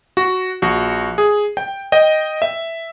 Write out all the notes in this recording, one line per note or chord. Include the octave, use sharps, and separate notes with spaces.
F#4
A#1 F#4
G#4
G5
D#5 G5
E5